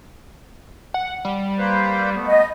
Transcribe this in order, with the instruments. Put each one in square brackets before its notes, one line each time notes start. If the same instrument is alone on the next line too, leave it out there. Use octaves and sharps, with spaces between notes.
[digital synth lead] F#5
G3
[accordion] A#3 B4 C5
A3 B3
[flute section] D#5